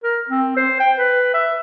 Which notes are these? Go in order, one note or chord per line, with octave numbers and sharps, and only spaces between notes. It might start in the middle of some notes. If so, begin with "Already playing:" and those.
A#4
C4
C5
G5
B4
E5